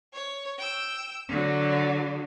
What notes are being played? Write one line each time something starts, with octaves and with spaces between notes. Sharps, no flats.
C#5
G5 E6
D3 F#3